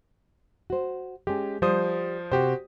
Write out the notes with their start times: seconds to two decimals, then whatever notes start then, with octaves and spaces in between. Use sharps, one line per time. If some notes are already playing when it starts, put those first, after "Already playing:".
0.70 F#4 C5
1.27 G#3 C#4 G4
1.62 F3 G3 C5 D#6
2.32 C3 F#4 G4 C5